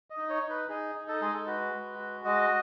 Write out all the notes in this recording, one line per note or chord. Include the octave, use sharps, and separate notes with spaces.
D#5
D#4
C#5
D#4
B4
D#4 G#4
D#4
A4
G#3 G#4
A4
F#4 B4
G#3
F#4
G#3 D#5